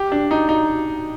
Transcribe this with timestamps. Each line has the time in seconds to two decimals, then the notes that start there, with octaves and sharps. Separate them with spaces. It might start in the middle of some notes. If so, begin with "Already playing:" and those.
Already playing: G4
0.12 D4
0.31 D#4
0.49 D#4